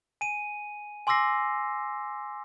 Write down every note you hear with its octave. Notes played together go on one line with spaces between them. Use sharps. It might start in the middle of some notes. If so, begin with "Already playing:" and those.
G#5 D#7
G#5 C6 D6 E6 A#6 C7